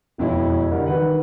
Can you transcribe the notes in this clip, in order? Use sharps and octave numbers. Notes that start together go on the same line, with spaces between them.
E1 F2 B2 E4 C#5
D3 G3 A#4
D#3 B4 F#5